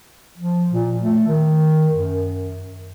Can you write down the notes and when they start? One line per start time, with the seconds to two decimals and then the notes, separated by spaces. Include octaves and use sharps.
0.38 F3
0.71 A#2
1.01 A3
1.27 D#3
1.94 F#2